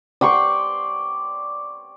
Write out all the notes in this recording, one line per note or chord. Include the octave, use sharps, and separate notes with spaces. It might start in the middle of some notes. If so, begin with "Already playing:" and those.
D5 G5 C6 C#6